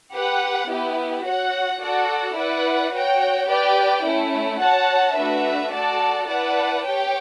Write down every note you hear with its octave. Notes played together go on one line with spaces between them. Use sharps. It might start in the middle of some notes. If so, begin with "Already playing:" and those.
G4 B4 F#5
B3 E4 G4
F#4 C#5 F#5
F#4 A4 D5 F#5
E4 B4 D5 F#5
F#4 C#5 G5
G4 B4 D5 G5
A3 C#4 E4
F#4 C#5 F#5 A5
A3 D4 F#4 B4 E5
F#4 A4 D5 A5
E4 B4 D5 F#5 A5
G4 C#5 G5